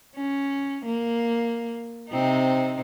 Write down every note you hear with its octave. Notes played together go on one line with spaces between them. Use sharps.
C#4
A#3
C3 C4 D#4